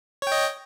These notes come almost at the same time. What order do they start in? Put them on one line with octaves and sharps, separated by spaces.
C#5 G5 D#5